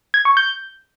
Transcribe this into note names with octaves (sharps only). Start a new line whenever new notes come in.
G#6
C#6
G6